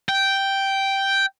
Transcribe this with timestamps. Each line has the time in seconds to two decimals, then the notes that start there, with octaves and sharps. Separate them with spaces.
0.09 G5